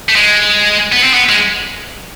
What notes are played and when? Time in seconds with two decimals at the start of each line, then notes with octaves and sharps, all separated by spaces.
0.09 A3
0.16 G#3
0.93 B3
1.03 C4
1.14 B3
1.29 G#3